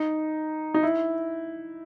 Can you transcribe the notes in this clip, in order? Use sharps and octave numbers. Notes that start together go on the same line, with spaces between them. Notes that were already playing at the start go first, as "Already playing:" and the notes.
Already playing: D#4
D#4
E4